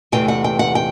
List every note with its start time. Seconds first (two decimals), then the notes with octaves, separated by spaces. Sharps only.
0.12 E2 C3 E3 A3 G5
0.28 F#5
0.44 G5
0.59 F#5
0.75 G5